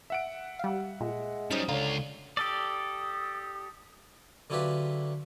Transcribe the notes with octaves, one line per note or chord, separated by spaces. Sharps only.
E5 F#5 D7
G3 F5
A#2 G#3
F#3 G3 C#4 D#4 C5 D#6 A6 B6
C#2 D3 F4 C#5 F5 A#5
G4 A4 D5 D#6
D3 F#3 E4 F4 G4 B4